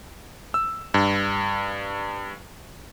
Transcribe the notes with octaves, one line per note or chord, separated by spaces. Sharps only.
E6
G2